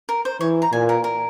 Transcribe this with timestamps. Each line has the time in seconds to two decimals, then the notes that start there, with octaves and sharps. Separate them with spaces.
0.09 A#4
0.25 C5
0.41 E3 C#5
0.62 A#5
0.72 A#2 G#5
0.89 A#4
1.04 A#4